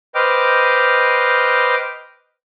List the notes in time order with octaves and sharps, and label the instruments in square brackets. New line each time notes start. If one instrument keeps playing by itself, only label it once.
[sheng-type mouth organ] B4 C5 D#5 G5 D6 F6